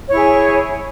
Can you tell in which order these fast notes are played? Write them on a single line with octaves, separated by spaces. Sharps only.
C#5 E4 G#4